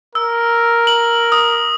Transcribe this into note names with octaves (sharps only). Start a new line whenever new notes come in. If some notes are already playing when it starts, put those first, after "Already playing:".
A#4 E6
F#7
D#6